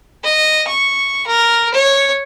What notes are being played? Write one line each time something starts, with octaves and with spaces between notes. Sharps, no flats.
D#5
C#6
A#4
C#5